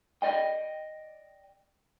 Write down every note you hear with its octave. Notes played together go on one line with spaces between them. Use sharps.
D5 D#5 G5